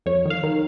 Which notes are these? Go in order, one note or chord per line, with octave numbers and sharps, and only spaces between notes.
F2 C#5
D#3
F5
D#3